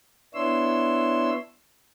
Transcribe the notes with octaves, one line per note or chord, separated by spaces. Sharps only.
B3 D4 E4 C#5 C6 E6